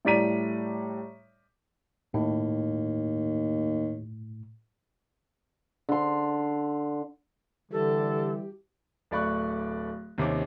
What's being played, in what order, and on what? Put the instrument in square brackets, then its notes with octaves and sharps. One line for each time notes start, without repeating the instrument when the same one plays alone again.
[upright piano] A2 G3 D5 A#5 B6 D#7
[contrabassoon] D#2 [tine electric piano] A2
[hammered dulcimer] D3 C6
[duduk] D3 [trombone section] E3 G3 [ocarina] G4 [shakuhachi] A4
[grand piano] D1 A3 D5 B5 C#6 F#6
D#2 C3 C#4 D6